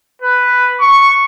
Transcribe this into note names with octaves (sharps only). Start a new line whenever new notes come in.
B4
C#6